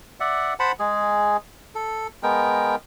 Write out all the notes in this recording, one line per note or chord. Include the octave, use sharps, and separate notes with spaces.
D5 E5 F#5
C5 F#5 A5 B5
G#3 G#4
A4
G#3 B3 A#4 G5